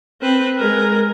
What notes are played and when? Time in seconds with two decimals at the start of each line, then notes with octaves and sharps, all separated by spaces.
0.22 C4 B4
0.58 G#3 A#4